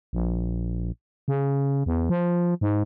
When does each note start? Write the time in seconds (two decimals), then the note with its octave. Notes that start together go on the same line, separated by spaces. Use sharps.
0.13 A#1
1.28 C#3
1.86 E2
2.10 F3
2.61 G#2